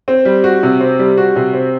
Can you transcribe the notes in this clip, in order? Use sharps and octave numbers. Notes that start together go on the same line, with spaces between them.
C4
G3
F#4
C3
C4
G3
F#4
C3
C4